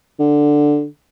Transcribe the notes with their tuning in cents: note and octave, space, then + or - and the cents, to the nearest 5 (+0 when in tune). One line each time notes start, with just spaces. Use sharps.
D3 +5